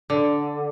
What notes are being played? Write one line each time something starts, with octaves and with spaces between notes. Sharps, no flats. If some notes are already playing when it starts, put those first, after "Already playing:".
D3